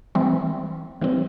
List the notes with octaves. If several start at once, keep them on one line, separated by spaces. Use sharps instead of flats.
E3 G3 C4
E3 G3 C4